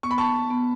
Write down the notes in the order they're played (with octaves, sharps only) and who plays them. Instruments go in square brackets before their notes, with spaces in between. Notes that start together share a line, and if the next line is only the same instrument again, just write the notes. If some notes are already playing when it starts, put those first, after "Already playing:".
[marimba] B3 [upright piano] C#6
[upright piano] B5
A5 C#6
[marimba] B3